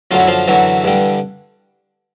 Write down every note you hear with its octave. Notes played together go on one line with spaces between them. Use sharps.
F#2 D3 F#3 F4
E4
F3 F4
F#2 D3 E3 F#3 E4
G2 D3 G3